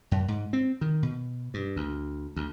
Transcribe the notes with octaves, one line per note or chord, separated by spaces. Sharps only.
F#2
G#2
C4
D#3
B2
G2
D2
D2